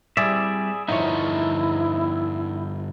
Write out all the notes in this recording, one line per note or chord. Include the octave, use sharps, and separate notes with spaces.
G3 C4 E4 G#4 D5 E5
E2 G2 D3 F3 D#4 E4 C#5 E5